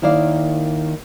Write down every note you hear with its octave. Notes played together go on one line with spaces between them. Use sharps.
D#2 D#3 E4 D5 F5